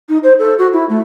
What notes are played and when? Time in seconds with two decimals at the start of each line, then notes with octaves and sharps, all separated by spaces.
0.09 D#4
0.23 C5
0.39 A4
0.59 F#4
0.73 E4
0.89 A3